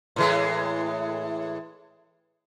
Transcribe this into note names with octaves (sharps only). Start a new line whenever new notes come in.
A2 E3 G#3